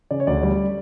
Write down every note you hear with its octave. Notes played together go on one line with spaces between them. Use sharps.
C#3 D5
C#5
D2 D5
G3